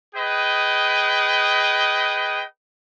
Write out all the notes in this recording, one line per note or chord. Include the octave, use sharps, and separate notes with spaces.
G#4 B4 D#5 G5